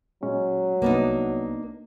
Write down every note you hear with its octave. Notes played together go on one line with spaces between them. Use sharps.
A#2 F#3 G#3 C#4
C2 A#3 B3 D4 D#4